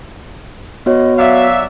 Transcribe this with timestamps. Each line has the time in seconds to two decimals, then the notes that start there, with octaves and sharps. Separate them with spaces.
0.86 B3 F#4 C#5 D#5
1.18 F#3 D5 E5 F5